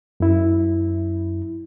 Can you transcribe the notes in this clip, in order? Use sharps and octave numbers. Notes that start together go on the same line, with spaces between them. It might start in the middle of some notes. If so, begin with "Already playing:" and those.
F#2 E4